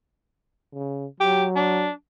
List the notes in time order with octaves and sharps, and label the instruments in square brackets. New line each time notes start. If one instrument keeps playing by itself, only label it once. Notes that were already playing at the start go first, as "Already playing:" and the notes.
[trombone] C#3
[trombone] F#3 [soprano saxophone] G4
[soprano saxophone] D4